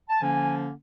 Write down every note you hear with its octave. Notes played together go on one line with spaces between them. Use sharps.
A5
D3 F3 A#3 C#4 G#5